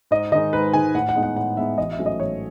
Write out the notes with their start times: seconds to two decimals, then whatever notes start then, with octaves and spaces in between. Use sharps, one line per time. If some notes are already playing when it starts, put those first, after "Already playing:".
0.11 G#2 D#5
0.32 D#3 G#3 D#4 D#5
0.53 G#2 B4
0.74 D#3 G#3 D#4 G#5
0.95 A2 F#5
1.09 F#5
1.15 G#3 B3 D#4
1.23 F#5
1.36 A2 F#5
1.57 G#3 B3 D#4 E5
1.78 A1 D#5
1.92 E5
1.99 G#2 F#3 A3 C#4
2.06 D#5
2.20 A1 C#5